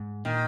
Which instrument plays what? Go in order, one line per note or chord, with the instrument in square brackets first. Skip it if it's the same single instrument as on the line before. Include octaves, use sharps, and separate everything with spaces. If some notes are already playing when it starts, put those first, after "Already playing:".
Already playing: [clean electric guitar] G#2
[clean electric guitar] A#2 [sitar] D#3